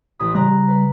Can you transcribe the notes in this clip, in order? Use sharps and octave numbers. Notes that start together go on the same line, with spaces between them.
A1 G#5 B5 D#6
C#3 G3 A#5 F#6
B4